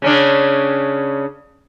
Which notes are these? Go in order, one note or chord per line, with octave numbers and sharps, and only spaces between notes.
C#3 C#4 D4